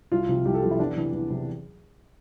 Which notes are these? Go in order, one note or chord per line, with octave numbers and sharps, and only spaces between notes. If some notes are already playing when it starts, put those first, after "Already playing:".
C2 F4
C3 F3
C2 G4
A4
C3 F3 G4
E4
E2 D4
C3 E3
E2
C3 E3